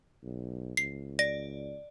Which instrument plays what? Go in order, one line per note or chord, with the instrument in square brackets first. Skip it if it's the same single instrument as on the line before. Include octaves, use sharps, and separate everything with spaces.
[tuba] B1
[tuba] C#2 [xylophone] C7
[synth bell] D5 [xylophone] A#6